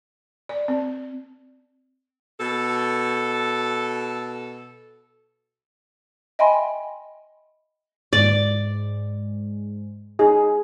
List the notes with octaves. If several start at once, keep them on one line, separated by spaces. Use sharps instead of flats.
D5
C4
B2 A4
D#5 E5 G5 G#5 B5 C6
G#2 D5
D#4 G#4